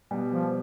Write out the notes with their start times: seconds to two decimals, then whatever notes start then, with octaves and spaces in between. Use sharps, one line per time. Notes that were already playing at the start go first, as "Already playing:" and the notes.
0.11 B2 G3 B3
0.33 F3